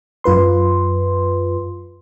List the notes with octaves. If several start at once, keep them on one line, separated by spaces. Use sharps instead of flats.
F#2 F4 B4 C6